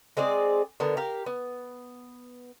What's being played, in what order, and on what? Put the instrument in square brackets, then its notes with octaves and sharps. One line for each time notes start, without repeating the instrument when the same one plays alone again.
[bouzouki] G#3 C4 G#4 D5
D3 B3 A#4
G4 A#4 F5
B3